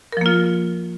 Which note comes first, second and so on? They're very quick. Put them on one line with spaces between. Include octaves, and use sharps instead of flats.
A#4 F3 A#3 F4